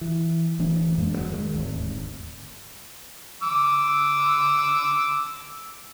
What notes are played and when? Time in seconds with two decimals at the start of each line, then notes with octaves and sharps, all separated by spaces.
0.01 E3
0.59 D1 D2 E3 D4
0.98 F2 A2 G#3 A#3
1.11 E1 B2 F#3
1.32 D#3 F#3 G#3
1.54 D1 G#1 D#2
3.43 D6 E6